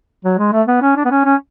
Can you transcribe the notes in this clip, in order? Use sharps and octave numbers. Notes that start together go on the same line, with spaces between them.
F#3
G#3
A3
B3
C#4
D4
B3
C#4
C#4